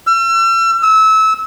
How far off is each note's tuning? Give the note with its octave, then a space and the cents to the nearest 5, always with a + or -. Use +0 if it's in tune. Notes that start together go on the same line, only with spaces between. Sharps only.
E6 +40
E6 -25